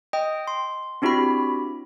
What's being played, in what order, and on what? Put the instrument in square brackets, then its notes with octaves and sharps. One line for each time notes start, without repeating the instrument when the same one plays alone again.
[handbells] D#5 G5 D#6
C6
C4 D4 E4 F#4 G4 B5